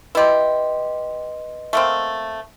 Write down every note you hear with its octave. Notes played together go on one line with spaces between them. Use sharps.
E4 G4 B4 D#5 C6
A3 A#3 C4